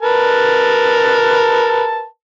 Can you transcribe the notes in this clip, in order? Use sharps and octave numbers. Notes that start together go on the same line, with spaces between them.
A#4 B4 A5